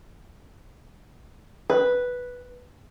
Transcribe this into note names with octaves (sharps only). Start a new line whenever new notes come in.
B4